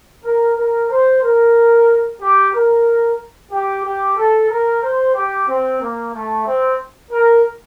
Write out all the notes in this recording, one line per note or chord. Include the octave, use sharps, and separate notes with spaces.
A#4
A#4
C5
A#4
G4
A#4
G4
G4
A4
A#4
C5
G4
C4
A#3
A3
C4
A#4